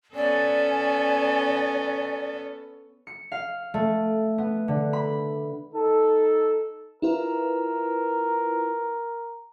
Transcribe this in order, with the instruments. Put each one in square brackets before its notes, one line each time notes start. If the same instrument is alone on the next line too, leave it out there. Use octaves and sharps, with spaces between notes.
[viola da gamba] B3 C#4 A4 [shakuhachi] D5 [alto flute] G#5
[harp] C#7
F5
A3
B3
D3
B5
[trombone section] D#4 A4
[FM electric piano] E4 F4 B4 [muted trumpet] A#4